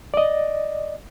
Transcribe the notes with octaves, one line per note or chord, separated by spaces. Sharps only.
D5 D#5